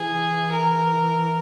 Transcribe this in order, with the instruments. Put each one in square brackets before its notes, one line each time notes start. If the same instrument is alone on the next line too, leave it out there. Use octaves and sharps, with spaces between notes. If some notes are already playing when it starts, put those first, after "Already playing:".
Already playing: [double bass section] E3 [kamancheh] G#4
[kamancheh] A#4